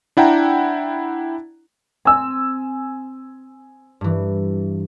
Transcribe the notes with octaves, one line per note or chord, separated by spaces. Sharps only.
D4 E4 F#5 G5 A#5
C4 G#5 E6
G2 E3